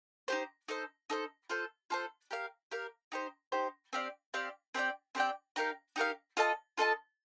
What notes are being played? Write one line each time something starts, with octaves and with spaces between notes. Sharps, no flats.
D#4 G4 C5
D#4 A4 C5
D#4 A4 C5
F4 A4 C5
F4 A4 C5
G4 A#4 F5
G4 A#4 F5
D#4 G4 C5
D#4 G4 C5
C4 G4 D5 F5
C4 G4 D5 F5
C4 G4 D5 G5
C4 G4 D5 G5
D#4 G4 A#4 F5
D#4 G4 A#4 F5
F4 A4 D#5 A5
F4 A4 D#5 A5